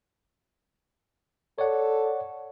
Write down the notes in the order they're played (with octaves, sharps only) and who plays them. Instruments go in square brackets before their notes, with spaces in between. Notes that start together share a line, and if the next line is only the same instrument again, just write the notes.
[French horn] A4 [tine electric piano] C#5 D5 F#5